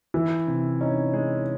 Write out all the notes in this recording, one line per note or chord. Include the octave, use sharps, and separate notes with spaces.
E3 E4
C3
C#4 D#4
G#3